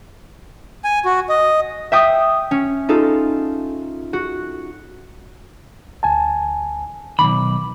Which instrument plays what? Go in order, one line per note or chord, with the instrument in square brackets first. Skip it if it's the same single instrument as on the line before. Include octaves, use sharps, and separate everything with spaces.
[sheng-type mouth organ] G#5
F#4
D#5
[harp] E5 G5 D#6
C#4
D#4 F4 A4
F#4
[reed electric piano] D2 G#5 A5
[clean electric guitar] B1 G2 B5 [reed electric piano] D#3 D6